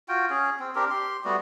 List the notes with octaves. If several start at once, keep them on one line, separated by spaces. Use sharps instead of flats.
F4 F#4 G5
C#4 G#4
C4
C4 D4 G4 A#4
G4 C6
G3 A3 B3 F#4